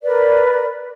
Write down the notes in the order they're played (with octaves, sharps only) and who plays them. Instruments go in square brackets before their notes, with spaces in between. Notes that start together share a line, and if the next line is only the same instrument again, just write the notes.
[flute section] A#4 B4 D5